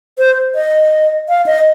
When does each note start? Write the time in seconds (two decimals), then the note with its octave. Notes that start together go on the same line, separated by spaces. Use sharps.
0.18 C5
0.55 D#5
1.29 F5
1.46 D#5